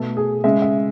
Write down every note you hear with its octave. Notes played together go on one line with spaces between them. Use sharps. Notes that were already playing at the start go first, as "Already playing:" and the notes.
Already playing: B2 A3 A4
G#4
C#3 G#3 E5
E5